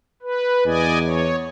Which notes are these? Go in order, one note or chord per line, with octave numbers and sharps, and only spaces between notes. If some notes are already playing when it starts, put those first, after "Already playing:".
B4
E2 D5 D#5 G#5
C#5